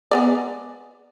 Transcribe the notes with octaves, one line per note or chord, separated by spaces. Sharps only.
G#3 B3 D5